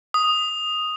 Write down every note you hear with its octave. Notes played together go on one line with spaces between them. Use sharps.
D#6